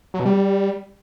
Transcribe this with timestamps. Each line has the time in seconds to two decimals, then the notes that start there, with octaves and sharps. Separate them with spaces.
0.14 F#3
0.20 B2
0.25 G3